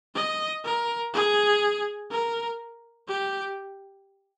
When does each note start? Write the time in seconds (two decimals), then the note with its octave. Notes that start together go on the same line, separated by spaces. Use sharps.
0.15 D#5
0.64 A#4
1.13 G#4
2.11 A#4
3.08 G4